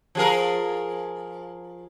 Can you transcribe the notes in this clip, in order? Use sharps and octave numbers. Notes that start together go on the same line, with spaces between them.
F3 G#4 A#4